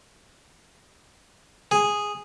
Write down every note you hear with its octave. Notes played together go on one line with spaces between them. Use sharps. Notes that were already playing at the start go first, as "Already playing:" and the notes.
G#4